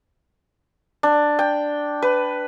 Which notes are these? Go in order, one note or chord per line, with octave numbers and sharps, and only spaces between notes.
D4
G5
B4